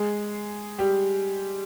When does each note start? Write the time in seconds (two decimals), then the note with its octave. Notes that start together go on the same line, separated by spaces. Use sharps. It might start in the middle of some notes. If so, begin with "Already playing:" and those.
Already playing: G#3 G#4
0.79 G3 G4